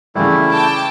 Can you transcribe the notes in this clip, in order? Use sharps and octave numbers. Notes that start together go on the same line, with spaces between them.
C#3 E3 G3 A3 E4
G5 A5 D6